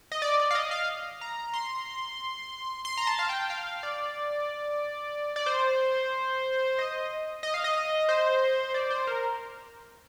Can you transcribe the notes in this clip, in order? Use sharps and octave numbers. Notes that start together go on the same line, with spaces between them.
D#5
D5
D5
F5
D#5
F5
A#5
C6
C6
A#5
A5
F5
G5
F5
D5
D5
C5
D#5
D#5
F5
D#5
C5
D5
C5
A#4